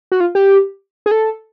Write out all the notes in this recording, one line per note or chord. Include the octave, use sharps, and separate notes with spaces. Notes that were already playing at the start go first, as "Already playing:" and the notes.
F#4
F4
G4
G#4
A4